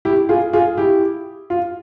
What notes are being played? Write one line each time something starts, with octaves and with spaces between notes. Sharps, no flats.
E4 G4
F4 G#4
F4 G#4
E4 G4
F4